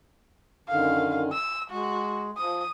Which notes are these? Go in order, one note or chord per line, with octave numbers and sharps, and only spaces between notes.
F#2 D3 D#3 F5
E6
G#3 F#4
F3 D#6